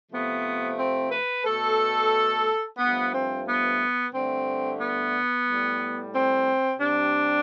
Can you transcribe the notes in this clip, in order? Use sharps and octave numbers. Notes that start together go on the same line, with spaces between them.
C3 F3 A3 B3
C4
B4
B2 A3 A4
G2 F3 A3 B3
C4
B3
G2 D3 A3 C4
B3
A2 G3
C4
C3 G3 D4